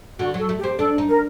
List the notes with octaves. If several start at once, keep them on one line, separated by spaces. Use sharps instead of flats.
D3 F#4
F#3 A4
A3
G4
C4
D4 A4
D#4
A#4